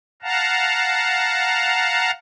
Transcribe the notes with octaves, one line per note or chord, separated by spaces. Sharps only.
F5 F#5 A5 A#5